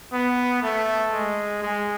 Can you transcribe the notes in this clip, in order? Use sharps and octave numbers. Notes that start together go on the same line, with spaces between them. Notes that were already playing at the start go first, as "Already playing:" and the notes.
B3
A3
G#3
G#3